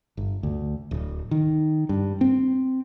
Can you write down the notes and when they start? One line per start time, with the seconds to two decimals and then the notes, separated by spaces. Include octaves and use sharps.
0.17 G1
0.43 D2
0.91 D1
1.31 D#3
1.89 G2
2.21 C4